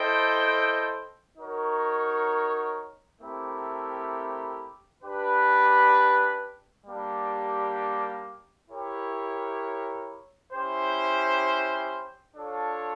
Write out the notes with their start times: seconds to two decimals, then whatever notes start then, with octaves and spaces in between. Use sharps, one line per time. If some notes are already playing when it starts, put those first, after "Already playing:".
Already playing: E4 A4 C5 D#5 G5
1.37 D#4 F#4 A#4 C#5
3.20 A3 C4 E4 G4 A#4
5.03 D4 G4 B4
6.87 G3 A#3 D4 G4
8.70 E4 G4 A#4 C#5
10.53 C#4 E4 G4 C5
12.37 D4 F4 A4 C#5